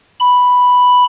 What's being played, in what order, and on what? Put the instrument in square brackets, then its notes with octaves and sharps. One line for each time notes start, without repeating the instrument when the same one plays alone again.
[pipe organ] B5